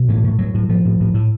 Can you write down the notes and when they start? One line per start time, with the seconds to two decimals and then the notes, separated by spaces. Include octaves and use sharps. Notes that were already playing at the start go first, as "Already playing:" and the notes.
Already playing: B2
0.08 A2 E3
0.24 A2
0.39 A2 F#3
0.54 A2
0.69 A2 F3
0.85 A2
1.00 A2
1.14 A2